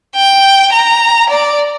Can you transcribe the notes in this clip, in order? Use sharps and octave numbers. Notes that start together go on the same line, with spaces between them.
G5
A#5
D5